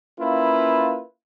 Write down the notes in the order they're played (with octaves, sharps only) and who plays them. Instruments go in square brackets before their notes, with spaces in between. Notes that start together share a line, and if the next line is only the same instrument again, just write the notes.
[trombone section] A#3 C#4 E4 F4 B4